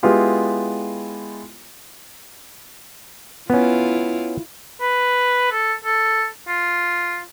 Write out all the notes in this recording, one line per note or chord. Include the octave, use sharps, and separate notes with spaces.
G#3 B3 E4 F4 G4
B3 C#4 E4 F4
B4
A4
A4
F4